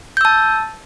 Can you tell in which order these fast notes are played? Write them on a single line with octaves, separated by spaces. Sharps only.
G6 E6 A5